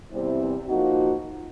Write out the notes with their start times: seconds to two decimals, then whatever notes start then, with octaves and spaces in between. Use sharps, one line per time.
0.11 E2 C3 E3 G3 C4
0.69 F3 A#3 D#4 F#4